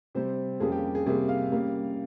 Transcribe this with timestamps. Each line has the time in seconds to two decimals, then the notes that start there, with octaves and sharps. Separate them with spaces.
0.15 C3 G3 C4 C5
0.60 F2 C#3 G3 A#3 G#4
0.72 G4
0.95 G#4
1.06 C3 G3 A#3 G#4
1.29 F5
1.52 C#3 G3 A#3